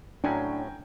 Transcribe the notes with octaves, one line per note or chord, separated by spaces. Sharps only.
A2 F#3 C#4 D4 G5 G#5 A#5